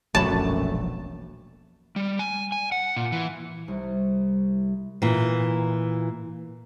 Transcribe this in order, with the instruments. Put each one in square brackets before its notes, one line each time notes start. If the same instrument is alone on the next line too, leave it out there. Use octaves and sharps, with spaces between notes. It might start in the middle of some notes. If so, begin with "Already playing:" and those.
[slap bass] E1 A#1 [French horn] F#2 [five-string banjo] F#3 A3 B5 [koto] A5
[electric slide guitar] G3
G#5
G#5
F#5
A#2
E3
[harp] C2
[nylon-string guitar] A#2 E3